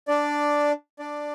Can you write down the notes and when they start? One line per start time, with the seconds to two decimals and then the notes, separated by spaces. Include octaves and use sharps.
0.08 D4 D5
0.99 D4 D5